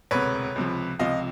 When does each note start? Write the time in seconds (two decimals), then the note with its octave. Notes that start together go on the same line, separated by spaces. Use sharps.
0.11 E1 D2 C3 B4 C#5
0.56 C#2 C3 F3
0.99 C#2 C3 F3 D#5 F5